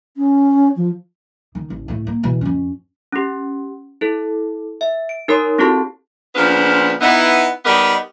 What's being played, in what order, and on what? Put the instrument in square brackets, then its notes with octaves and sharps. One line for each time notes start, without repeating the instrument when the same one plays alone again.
[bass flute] C#4
F3
[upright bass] D#3
A1
A2 A3
A#3
B2 E3
F2 C#4
[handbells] C#4 G4
E4 A4
E5
D7
D#4 A#4 C#5 C6
C4 E4 F#4 G4 A4 A5
[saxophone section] A#2 C#3 F3 B3 D4 F4
B3 D#4 E4
G3 B3 D#4 G4 A#4 D#5